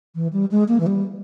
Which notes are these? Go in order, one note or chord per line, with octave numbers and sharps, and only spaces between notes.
E3
G3
G#3
A#3
E3
G3